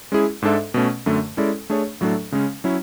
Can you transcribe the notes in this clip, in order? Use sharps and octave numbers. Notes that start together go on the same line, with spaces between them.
G#3 C#4 E4 G#4
G#2 G#3 D4 A4 E5
B2 A3 C#4
F#2 D3 A3
G#3 C#4 E4 A4 D5
A3 D4 G#4 C#5
A2 F#3 A3 D4 A4
C#3 G#3 C#4
F#3 C#4 E4